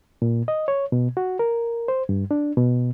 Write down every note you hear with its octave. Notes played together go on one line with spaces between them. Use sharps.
A#2
D#5
C#5
B2
F#4
A#4
C5
G2
D4
B2